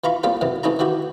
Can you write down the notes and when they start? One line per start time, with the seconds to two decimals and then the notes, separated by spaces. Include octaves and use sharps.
0.04 E3 F4 A#5 B5 C#6
0.24 G3 G#3 A#3 C4 F4
0.41 F#2 C3 E3 F#3
0.63 E3 A3 C#4 D#4 E4 A#5
0.79 D#3 E3 E4 F#4 G4